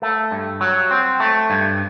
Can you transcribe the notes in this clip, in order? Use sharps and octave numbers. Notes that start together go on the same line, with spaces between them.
A3
G2
F#3
C4
A3
G2